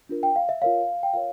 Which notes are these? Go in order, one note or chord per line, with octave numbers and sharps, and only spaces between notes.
D4 F4 A#4
G5
F5
E5
F4 A#4 C#5 F5
G5
F4 A#4 C#5 F5